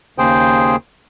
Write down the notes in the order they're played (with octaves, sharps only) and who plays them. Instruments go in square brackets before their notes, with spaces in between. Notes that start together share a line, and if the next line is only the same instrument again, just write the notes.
[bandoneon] D#2 C#3 G#4 C5 G5